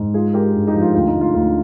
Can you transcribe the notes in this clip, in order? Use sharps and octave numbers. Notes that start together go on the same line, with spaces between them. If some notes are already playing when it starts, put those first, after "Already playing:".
Already playing: G#2
G#3 F4 G#4
G#3 G4 A#4
G2
D#4 G4
F3
F4
D2 F4
D#4
D2
F4
D2 F4